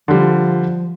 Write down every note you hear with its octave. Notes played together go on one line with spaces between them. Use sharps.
D3 F3 G3